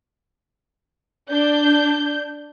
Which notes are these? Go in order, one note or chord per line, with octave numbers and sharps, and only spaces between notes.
D4 G6